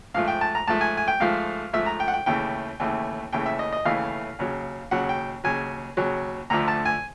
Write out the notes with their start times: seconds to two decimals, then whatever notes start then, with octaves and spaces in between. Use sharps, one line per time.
0.14 G#2 F3 A3 F5
0.28 G5
0.41 A5
0.55 A#5
0.68 G#2 F3 A3 A5
0.81 G#5
0.97 G#5
1.08 G5
1.20 G#2 F3 A3 F5
1.73 G#2 F3 A3 E5
1.86 A#5
2.00 G5
2.08 F#5
2.14 G5
2.26 D#2 C#3 E3 A3 G5
2.80 D#2 C#3 E3 A3
3.32 D#2 C#3 E3 A3 G5
3.46 E5
3.59 D#5
3.73 D#5
3.85 D#2 C#3 E3 A3 F5
4.39 D#2 C#3 F#3
4.91 D#2 C#3 F#3 F#5
5.09 G5
5.44 D#2 C#3 F#3 G#5
5.97 D#2 C#3 F#3
6.50 D2 D3 F3 A3 A#5
6.68 A5
6.85 G#5